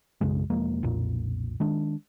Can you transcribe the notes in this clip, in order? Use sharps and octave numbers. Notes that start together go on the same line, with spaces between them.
B1 F#2 C#3 G#3
E1 F3 G#3 A#3
B1 F2 A#2
D#3 G#3 D4